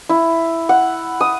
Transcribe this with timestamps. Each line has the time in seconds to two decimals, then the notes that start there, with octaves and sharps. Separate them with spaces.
0.09 E4
0.69 F#5
1.20 D#6